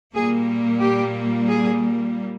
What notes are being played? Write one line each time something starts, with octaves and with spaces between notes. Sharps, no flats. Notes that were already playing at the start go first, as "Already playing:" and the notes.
A#2 G3 A#3 G#4
G4
G#4